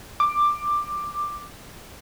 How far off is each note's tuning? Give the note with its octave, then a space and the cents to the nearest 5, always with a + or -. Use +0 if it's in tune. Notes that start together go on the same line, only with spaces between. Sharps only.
D6 +10